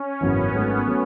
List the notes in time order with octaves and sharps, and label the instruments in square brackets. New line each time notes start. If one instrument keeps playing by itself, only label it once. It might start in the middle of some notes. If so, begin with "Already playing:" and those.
Already playing: [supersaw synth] C#4
[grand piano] G#1 F#2 C#3 E3 [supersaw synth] B3
[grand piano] G#1 G#2 F#3 A3 C#4
F#3 A3 C#4